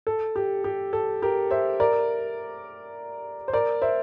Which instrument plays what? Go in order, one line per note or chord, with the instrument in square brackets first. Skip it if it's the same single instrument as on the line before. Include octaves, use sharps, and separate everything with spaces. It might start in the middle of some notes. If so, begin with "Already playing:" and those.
[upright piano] A4
G4
G4
A4
G4 A#4
C5 E5
A#4 D5
C5
A#4 D5
C5 E5